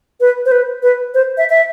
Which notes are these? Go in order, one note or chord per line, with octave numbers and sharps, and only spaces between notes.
B4
C5
B4
B4
C5
E5
E5